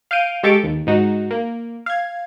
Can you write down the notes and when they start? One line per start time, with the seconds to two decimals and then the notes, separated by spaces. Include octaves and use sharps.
0.11 F5 F6 G6 D7 D#7
0.43 G#3 G4 A4 C#6 A6 D7
0.64 D#2
0.87 G#2 D#4 F#4
1.31 A#3
1.86 F5 G#6